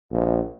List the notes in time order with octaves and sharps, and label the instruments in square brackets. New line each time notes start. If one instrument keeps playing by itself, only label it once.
[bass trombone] A#1